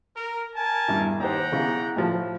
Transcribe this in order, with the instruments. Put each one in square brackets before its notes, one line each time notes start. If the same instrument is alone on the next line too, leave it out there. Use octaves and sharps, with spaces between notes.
[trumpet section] A#4
A#4 G#5 A5
[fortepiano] E2 G2
[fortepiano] D#2 G4 C5 [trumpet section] F#5 G5 A#5
[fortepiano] C#3 E3 B3
A2 F3